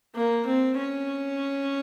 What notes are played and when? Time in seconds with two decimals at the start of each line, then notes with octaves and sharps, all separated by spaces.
0.15 A#3
0.46 C4
0.77 C#4